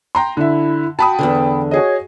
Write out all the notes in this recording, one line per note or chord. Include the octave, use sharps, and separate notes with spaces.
G5 A#5 C6
D3 E4 E5
F#4 G5 A5 B5 D#6
E2 G2 D3
F#4 G#4 C#5 D#5